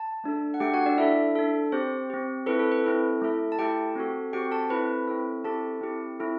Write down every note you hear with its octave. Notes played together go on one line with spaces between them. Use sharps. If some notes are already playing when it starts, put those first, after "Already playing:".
Already playing: A5
A3 D4 A4
F#5
A3 D4 G4 A4 G5
F#4 F#5
D4 D5
D4 E4 A4 E5
D4 A4
C4 G4 C5
C4 G4
C4 E4 A4 B4
A4
B4
C4 E4 A4
A3 E4 A4
A5
A3 E4 G4 A4 G5
C4 F#4 A4
C4 F#4 G4 A4 G5
A4 A5
C4 E4 A4 B4 B5
C4 E4 A4
C4 E4 G4 A4 A5
C4 E4 G4
C4 E4 A4